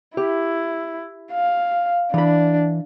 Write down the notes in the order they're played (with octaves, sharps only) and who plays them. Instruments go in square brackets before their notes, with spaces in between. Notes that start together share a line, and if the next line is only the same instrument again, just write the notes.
[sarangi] E4 [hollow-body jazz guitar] G4
[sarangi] F5
[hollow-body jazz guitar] E3 B5 [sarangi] D4